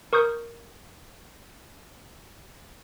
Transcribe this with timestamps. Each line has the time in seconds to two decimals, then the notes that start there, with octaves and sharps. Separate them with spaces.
0.13 A#4 C#6 D#6 G6